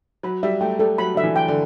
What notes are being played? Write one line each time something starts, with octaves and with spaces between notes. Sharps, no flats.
F#3 B5
G3 E5
A3 G5
G3 A4
F#3 B5
D3 E5
E3
G5
D3